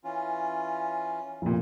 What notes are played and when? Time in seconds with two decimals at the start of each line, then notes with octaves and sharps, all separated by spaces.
0.04 E3 C#4 F4
1.42 F1 A#2